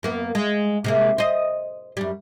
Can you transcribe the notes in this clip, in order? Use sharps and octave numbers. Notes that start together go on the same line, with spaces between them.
F#2 A#3 B3
G#3
C3 G#3 A#3
C5 D#5
F#2 G3